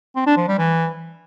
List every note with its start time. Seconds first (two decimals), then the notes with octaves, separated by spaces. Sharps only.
0.16 C4
0.27 D4
0.37 F3
0.48 G3
0.58 E3